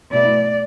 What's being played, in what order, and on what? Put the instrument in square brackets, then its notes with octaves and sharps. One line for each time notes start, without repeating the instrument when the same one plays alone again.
[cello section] B2 A3 E4 D5